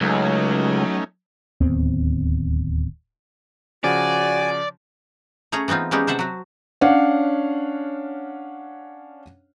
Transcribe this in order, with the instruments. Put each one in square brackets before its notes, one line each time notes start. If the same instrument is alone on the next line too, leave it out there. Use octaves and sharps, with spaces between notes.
[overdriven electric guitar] C#2 [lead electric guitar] F#3 [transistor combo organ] A3 C#4 D#4
[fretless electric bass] D1 D#2 B3 C4
[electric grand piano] C#3 F3 [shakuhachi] F#4 [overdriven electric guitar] D5 [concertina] G#5
[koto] A3 C#4 G#4 C#5 A#5
E3 B3 C4 D#4 F4
G3 G#3 B3 C#4 D#4 G4
C3 C5 E5 F#5 A5
F#3 F#4
[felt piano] C#4 D4 C#5 F5 F#5